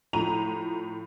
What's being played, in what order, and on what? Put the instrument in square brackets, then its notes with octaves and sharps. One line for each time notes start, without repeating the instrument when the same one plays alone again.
[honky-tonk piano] A2 F3 A#5 D#7 F7